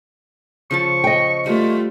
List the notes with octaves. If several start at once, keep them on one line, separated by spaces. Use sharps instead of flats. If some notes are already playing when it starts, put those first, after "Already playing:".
C#3 F3 A5 C#6
D#5 G5
G3 A3 F4